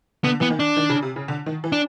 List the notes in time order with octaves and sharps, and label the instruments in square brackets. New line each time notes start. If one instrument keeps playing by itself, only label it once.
[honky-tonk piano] D3 [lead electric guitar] B3
[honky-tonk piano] E3 [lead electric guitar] B3
[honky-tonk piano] D#3
[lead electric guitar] D4
[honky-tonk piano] D#3
C#3
C3
C#3
D3
D#3
E3
[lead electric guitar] D4